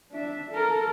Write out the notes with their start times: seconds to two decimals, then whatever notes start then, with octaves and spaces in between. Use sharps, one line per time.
0.12 D4 E5
0.51 A4 A#4